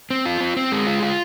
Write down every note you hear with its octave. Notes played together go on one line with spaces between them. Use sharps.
C4
F4
C4
C4
G#3
F4
F4